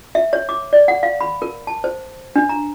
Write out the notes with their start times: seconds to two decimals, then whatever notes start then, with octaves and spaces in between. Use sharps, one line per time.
0.15 E5
0.33 C#5
0.49 D6
0.73 D5
0.88 F#5
1.03 F5
1.21 B5
1.42 A#4
1.67 A5
1.84 C5
2.36 D4
2.49 A#5